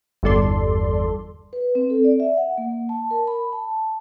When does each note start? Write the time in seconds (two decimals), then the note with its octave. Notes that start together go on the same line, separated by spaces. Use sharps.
0.23 G1 E2 G3 A4 D5 C6
1.53 B4
1.75 C4
1.90 A4
2.04 D5
2.20 E5
2.37 F#5
2.58 A#3
2.89 A5
3.11 A#4
3.27 B5
3.53 A5